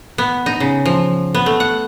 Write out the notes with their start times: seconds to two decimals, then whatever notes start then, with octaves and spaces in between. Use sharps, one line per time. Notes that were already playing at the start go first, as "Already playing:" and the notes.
0.18 B3
0.46 D#4
0.60 C#3
0.85 F3
1.34 B3
1.46 A3
1.60 F#5